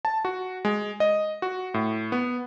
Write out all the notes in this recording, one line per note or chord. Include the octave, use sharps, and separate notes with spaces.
A5
F#4
G#3
D#5
F#4
A2
B3